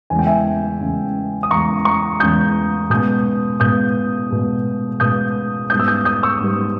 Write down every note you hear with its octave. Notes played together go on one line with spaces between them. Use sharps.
E2 C#3 G#3 G#5
G5
E5 G#5
E2 C#3 G#3
D#6
E2 C#3 G#3 A#5 C#6
A#5 C#6
E2 C#3 G#3 D#6 G6
B2 G#3 B3 D#6 G6
B2 G#3 B3 D#6 G6
B2 G#3 B3
B2 G#3 B3 D#6 G6
G#2 G3 B3 D#6 G6
E6
D#6 G6
D#6 G6
C#6 E6
G#2 G3 B3